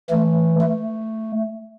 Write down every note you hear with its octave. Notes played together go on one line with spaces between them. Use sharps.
E3 A3
A3